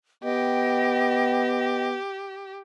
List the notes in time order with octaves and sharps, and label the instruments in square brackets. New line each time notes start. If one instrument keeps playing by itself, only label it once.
[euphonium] B3 [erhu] G4 [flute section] D#5 G5